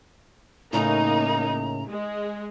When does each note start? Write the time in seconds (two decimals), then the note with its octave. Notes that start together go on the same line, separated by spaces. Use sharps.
0.73 A2 C#3 A#3 D#4 A#5
1.87 G#3